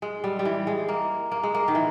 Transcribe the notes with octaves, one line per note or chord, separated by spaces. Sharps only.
G#3
G3
G3
E3
G#3
A#3
A#3
G#3
A#3
D#3
E3